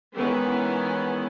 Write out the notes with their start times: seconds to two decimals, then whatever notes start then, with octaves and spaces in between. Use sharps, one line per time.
0.14 D#3 E3 G#3 B3 C#4